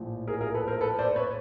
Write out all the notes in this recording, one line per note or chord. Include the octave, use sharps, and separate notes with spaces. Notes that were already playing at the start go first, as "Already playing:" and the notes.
Already playing: A#1 A2 F3
G#4 A#4
G#4 A#4
A4 B4
A#4 C5
A4 B4
C5 D5
B4 C#5